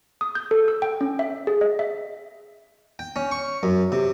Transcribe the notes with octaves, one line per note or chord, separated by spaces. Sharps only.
D#6
G6
A4
E6
G5
C#4
E5
G#4
D#5
E5
G5
C#4
C#6
F#2
C3